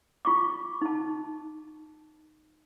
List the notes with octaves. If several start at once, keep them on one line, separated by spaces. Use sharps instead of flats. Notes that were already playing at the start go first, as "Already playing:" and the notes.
F4 C#6 D6
D#4 A5